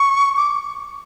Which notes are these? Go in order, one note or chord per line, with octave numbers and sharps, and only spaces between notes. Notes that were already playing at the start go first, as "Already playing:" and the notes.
Already playing: C#6
D6